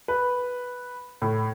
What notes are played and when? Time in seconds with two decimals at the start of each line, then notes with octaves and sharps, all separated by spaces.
0.08 B4
1.22 A2